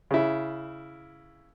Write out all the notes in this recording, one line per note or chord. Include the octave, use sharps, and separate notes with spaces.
C#3 E4